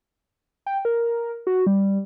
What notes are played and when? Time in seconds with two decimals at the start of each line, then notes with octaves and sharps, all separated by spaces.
0.66 G5
0.85 A#4
1.47 F#4
1.67 G3